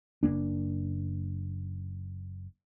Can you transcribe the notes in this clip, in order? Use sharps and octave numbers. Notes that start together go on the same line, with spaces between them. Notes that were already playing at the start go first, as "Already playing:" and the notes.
F#1 G2 A#3 D4